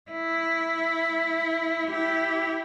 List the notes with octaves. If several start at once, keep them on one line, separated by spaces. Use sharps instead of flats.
E4
E4 G4